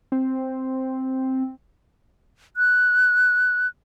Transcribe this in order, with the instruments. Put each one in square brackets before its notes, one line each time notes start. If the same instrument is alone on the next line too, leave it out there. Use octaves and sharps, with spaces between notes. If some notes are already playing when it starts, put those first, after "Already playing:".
[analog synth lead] C4
[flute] F#6